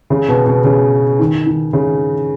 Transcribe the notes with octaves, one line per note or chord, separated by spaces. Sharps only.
C#3
B2
B2
C#3
D#3
D#3
C#3